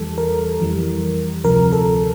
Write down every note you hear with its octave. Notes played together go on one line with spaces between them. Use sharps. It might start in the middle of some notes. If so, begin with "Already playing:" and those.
Already playing: E2 E3 G3 A4
A#4
F2 E3 G3
D2 C3 F3 A#4
A4